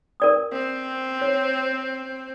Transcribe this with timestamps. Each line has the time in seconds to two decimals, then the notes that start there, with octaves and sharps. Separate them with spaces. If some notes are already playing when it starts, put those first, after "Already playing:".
0.20 A#4 D5 D#6
0.53 C4
1.21 C#5